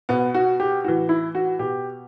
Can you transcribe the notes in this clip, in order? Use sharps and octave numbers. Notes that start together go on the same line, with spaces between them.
B2 B3
F#4
G4
A2 E3 F#4
E4
F#4
B2 G4